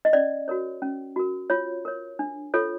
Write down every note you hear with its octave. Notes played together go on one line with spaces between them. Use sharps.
D#5
C#4 D5
F#4 A#4 C#5
C#4
F#4 A#4
F4 C#5
A#4 C#5
D4
F4 A4 C#5